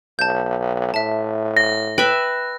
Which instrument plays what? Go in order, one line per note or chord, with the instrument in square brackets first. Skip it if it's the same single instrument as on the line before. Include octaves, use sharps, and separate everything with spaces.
[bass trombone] B1 [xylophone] A5 G6
[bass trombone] A2 [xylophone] E5 A5
[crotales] A#6
[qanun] B4 E5 [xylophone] G5